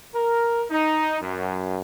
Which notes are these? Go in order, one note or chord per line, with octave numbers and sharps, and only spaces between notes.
A#4
D#4
F#2